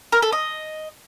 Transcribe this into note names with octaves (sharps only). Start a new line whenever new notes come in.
A#4
A4
D#5